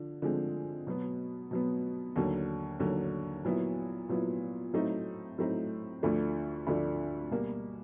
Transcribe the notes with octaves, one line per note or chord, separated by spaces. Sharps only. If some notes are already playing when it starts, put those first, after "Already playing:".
Already playing: D3 F3
D3 F3 G#3 C4
B2 F#3 B3
B2 F#3 B3
D#2 D3 F#3
D#2 D3 F#3
A#2 F#3 B3 E4
A#2 F#3 B3 E4
A2 F#3 A3 C4 D#4
A2 F#3 A3 C4 D#4
D2 D3 F3 A3 D4
D2 D3 F3 A3 D4
B2 G3 A#3